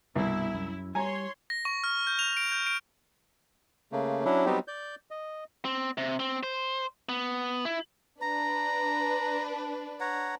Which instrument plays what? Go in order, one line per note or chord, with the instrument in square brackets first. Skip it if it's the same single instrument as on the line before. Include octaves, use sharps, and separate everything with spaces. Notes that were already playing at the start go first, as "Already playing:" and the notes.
[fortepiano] C2 [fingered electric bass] G2 B2 [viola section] E4
[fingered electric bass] F#2
[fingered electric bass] G3 [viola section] C#5 C6 [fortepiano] G#5 A#5
[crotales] A#6
C#6
F6
G6
F7
D7
G6
D7
[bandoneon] C#3 A3 A#3
F#3 C#4 D4 E4
F#3 G3 B3 C4 D#4 G4
D5 G6
D#5
[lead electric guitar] C4
C3
C4
C5
B3
E4
[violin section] D4 B4 [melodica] A#5
[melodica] C#5 F#5 A#5